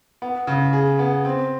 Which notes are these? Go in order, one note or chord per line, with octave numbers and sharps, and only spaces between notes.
B3
C#3
G#4
B3
C4